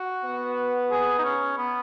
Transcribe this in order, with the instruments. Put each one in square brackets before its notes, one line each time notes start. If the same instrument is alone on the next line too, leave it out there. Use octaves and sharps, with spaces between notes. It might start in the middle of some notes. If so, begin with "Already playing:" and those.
Already playing: [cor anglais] F#4
[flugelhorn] B3
[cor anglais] G#4
D#4
C#4
B3